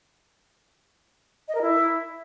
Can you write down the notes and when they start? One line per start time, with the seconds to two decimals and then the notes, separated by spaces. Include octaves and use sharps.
1.48 D#5
1.55 A#4
1.62 E4